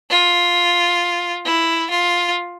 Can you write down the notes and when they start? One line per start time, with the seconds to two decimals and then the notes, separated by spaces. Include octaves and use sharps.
0.10 F4
1.45 E4
1.91 F4